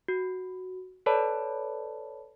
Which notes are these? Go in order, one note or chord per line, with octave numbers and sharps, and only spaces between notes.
F#4
A4 B4 C#5 D5 A5 B5